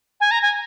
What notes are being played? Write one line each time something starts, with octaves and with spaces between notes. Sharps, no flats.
G#5
A#5
G#5